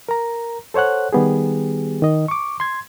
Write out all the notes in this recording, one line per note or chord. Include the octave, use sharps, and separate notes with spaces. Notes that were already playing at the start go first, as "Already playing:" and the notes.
A#4 A#5
A4 C5 C#5 F#5 F#6
D#3 G3 B3 G4 G#4
D#3 D#5
C#6 D6
C6 G#6